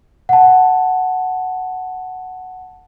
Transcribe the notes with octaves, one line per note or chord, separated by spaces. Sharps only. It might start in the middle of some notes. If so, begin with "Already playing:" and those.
F#5 A5